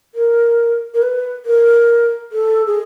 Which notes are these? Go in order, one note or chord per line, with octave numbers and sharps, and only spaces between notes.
A#4
A#4
B4
A#4
A4
G#4